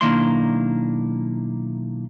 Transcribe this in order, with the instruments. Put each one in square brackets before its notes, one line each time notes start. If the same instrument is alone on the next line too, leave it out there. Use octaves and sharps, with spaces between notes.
[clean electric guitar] B1 D#3 A#3 D4 E4 C6